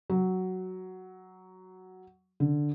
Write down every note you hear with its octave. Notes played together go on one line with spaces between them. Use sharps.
F#3
D3